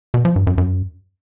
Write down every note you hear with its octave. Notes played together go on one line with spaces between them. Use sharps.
B2
F3
G2
F#2
F#2